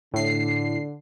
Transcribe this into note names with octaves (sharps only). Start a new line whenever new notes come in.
A2 D3 C7